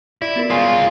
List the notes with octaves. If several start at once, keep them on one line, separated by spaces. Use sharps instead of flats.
E4 D5 D7
B3 F#4 A#4
G#3 F4 C#5 F5 G#5